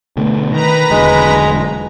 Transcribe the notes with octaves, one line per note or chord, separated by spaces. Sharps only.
B2 D3 A3
D#3 B4 A#5
E1 D3 F#3 G#3